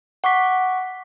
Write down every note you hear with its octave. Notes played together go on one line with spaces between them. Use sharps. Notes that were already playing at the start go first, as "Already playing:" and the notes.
F#5 C#6 D6 B6